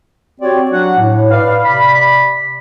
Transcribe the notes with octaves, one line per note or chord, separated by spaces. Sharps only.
C4 F#4 G4 C#5 D5
F#3 D4 F#4 F#5
A2
B4 D5 F5
C3 D5 B5